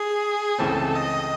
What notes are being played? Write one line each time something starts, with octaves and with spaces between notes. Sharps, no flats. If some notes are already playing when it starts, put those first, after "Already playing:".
Already playing: G#4
C#2 C#3 E3 A3 C4 A4
D#5